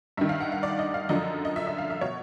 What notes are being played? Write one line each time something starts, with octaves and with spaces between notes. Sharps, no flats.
G2 D#3 E5
F5
F#5
F5
D5
D#5
F5
F#2 D3 F3 D#5
D#5
E5
E5
F5
E5
B2 C#5